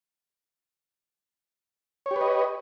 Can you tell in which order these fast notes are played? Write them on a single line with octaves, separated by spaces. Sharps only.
C#5 G4 B4 D#5